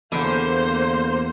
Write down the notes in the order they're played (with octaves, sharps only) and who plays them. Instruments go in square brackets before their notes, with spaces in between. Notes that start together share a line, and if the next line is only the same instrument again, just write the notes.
[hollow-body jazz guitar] E2 [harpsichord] D3 [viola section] A#3 C5